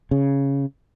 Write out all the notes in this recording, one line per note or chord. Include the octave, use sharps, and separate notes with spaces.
C#3